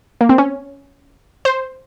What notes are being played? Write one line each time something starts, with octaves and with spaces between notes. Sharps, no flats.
A#3
C4
C#4
C5